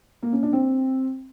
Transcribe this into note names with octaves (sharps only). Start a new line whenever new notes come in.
A#3
C#4
D4
C4